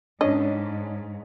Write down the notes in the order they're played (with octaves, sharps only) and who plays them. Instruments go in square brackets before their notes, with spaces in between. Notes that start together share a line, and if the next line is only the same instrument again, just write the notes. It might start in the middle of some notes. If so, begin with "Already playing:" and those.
[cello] G#2 [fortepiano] C#4 D4 [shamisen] D#5